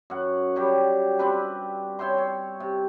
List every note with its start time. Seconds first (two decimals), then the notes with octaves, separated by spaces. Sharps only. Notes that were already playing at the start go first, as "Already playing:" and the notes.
0.10 F#2 F#5
0.56 F#3 G3 G4
1.19 C4 D4 G4 B4
1.99 C#5 E5 G5 C6
2.18 C#5
2.60 C3